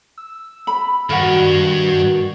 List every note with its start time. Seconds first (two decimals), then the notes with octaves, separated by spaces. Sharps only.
0.18 E6
0.67 B5
1.10 G2 D#3 F#4 A#4 F#5 G5